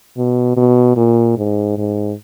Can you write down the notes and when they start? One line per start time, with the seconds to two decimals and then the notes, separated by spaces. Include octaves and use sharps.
0.17 B2
0.57 B2
0.97 A#2
1.37 G#2
1.78 G#2